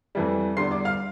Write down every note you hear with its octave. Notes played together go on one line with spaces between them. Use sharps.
F2 E3 G3
E2 D3 G3 C6 C7
D5 D6
F5 F6